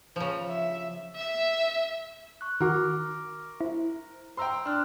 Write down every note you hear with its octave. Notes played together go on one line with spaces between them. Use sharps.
C#3 F3
E5
E5
C#6 F#6
D#3 F#4 A#4 C#6 D6 F6
E4 C5
C5 G5 A#5 C6 E6
D4 C6 F6 F#6